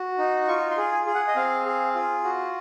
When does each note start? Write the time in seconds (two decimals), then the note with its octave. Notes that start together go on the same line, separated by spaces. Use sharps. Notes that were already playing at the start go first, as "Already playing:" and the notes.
Already playing: F#4
0.18 D#4
0.48 F4 C#6
0.70 C6
0.77 G#4
0.92 G#5
1.07 G#4
1.15 F#5
1.28 D#5
1.36 C4 F5
1.66 G#4
1.95 F4
2.24 F#4